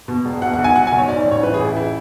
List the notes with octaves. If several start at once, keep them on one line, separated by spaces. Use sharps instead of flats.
B2
E1
B2 F#5
F#5
B1
G#5
F#3 F#5
G#5
B1
C#5
G#2 D5
D5
A1
C#5
E3 B4
G#4
A1
E4
E4